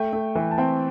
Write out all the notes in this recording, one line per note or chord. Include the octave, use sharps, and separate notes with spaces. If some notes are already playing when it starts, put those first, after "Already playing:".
Already playing: A3 G5
A3
E3
A5
C4 G5